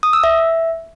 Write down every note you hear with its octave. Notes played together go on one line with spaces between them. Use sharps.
D#6
E6
E5